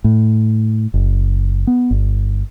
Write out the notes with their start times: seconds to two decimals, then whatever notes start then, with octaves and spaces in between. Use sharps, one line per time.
0.04 A2
0.94 F#1
1.67 B3
1.91 G1